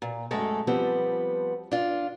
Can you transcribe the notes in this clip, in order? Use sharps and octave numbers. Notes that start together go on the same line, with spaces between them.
A#2
F#2 G#3 A3 A4
F3 G3 B3 C4
D4 F4